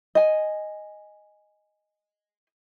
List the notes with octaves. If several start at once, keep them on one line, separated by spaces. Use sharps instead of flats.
D#5 G#5